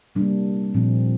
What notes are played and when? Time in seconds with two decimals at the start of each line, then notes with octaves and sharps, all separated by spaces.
0.15 C3 G3 A#3 D4
0.74 A#2 F3 C4